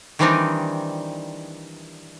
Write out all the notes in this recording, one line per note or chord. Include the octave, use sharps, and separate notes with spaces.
D#3 E3 G3 C4 D4 D#4